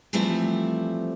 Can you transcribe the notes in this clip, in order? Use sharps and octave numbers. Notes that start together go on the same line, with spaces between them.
E3 F3 G3 A3 C4